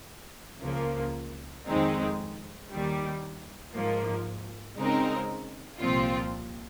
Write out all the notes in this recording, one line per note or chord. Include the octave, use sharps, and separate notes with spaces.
C#2 C#3 F3 A#3
F2 D#3 G#3 C4 D#4
D#2 D#3 G3
G#2 F3 A#3
C#3 G#3 C4 D#4 A#4
C2 A#2 F3 C4 F4